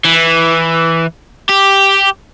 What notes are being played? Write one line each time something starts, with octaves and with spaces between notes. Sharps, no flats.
E3
G4